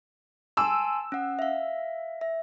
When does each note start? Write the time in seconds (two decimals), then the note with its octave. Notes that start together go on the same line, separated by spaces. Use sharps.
0.57 G#5 A5 C6 E6
1.12 C#4 F#5
1.39 E5 F5
2.21 E5